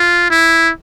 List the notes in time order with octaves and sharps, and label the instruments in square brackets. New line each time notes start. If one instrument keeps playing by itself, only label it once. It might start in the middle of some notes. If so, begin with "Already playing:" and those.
Already playing: [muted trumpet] F4
E4